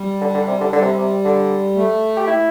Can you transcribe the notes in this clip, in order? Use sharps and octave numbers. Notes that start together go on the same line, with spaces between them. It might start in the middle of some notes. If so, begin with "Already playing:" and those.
Already playing: G3
D3
D3
C3
D3
D3 G3
C3
C3
D3
A3
G4
E4